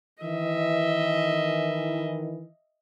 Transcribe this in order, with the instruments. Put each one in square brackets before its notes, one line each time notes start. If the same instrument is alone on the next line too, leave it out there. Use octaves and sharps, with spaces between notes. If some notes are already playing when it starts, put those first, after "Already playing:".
[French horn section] D#3 E3 [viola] D#5 E5